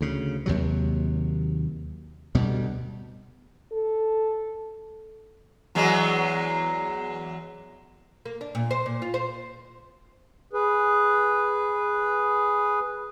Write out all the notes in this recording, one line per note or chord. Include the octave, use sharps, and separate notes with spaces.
D2 C#3
D#2 C3 F#3
D2 B2 G3
A4
E2 F#3 G#3
A#3
D4
A#2
C5
A#2
F4
C5
G#4 B4